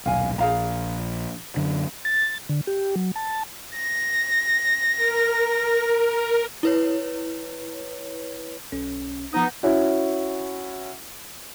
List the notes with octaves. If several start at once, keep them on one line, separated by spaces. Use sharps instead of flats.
D#1 B1 F5 G#5
A#1 G#4 F5 A#5
F#2 D3
A6
D3
G4
F#3
A5
A#6
A#4
E4 B4 C#5
B1 C#4
F3 B3 D#4 D#6
C#4 E4 F#4